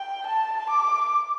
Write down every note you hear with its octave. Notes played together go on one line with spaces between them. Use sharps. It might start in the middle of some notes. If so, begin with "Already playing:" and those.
Already playing: G5
A5
D6